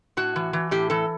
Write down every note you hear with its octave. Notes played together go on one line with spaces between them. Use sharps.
A2 F#4
E3
E3
A2 G4
E3 A4